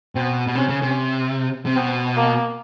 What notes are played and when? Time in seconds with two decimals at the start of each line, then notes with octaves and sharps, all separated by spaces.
0.15 B2 C4
0.47 B2
0.55 C3 C#4
0.69 C#3
0.82 C3
1.66 C3
1.76 B2 C4
2.16 A#3